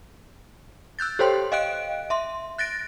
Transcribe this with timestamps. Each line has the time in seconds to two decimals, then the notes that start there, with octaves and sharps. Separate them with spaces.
0.99 E6 F#6 G6 A6
1.19 G4 A4 C5 C#5 G5 C6
1.52 D#5 F5 G5 F#6 D7
2.10 E5 C6
2.58 F#6 A6 A#6 D7